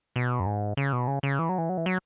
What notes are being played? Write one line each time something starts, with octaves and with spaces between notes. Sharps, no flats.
B2
F#2
G#2
C#3
B2
C#3
C#3
E3
F#3
E3
F#3
E3
F#3